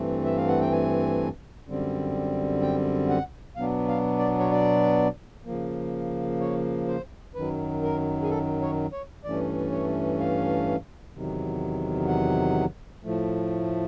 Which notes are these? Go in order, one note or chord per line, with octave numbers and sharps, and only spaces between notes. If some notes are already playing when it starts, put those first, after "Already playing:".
Already playing: G2 E3 A3 C4
E5
F5
F#5
G5
G#5
F#2 D3 G3 C4
G5
F#5
B2 F#3 B3 D4 F5
F5
D5
C#5
D5
C#3 F3 A#3
C#5
C5
F#2 D#3 F#3 B4
A#4
G#4
A4
C#5
C#5
G2 E3 A3 C#4 D5
C#5
F5
E2 C3 D#3 F#3
F#5
A2 F3 A3